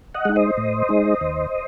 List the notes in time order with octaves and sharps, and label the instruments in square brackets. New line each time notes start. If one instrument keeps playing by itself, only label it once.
[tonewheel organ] D#5 F#5
G#3 D#4
C5 D#5
A2
G#3 D#4
D#2